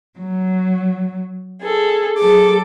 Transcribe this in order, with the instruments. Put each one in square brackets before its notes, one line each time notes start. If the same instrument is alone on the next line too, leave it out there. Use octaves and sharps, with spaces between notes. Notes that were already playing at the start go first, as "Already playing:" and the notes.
[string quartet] F#3
G#4 A4
[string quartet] F#3 A4 D6 [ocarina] G#4